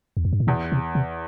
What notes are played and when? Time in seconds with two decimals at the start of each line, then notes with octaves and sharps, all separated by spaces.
0.17 E2
0.25 F2
0.33 G2
0.40 A2
0.47 E2 B2
0.72 C3
0.95 C3